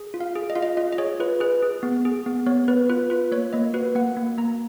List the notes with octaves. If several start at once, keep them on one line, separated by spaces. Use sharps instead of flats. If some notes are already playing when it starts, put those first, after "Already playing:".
Already playing: G#4
F4
F5
G#4
D#5
F4 F5
D#5
F4 D#5
D#5
G#4 C#5
F4 B4
G#4 B4
G#4
B3
G#4
B3
B3 C#5
B3 B4
F4 B4
F4 B4
A#3 C#5
A#3 D#5
F#4 B4
A#3 F#5
A#3
A#3 A#5